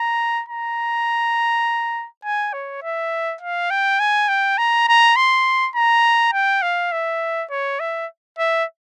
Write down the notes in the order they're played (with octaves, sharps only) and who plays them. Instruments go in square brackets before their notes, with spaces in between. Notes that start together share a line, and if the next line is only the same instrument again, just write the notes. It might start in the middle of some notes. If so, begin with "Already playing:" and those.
Already playing: [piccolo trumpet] A#5
A#5
G#5
C#5
E5
F5
G5
G#5
G5
A#5
A#5
C6
A#5
G5
F5
E5
C#5
E5
E5